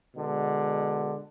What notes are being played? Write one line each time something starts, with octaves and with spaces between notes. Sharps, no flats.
B2 D3 G#3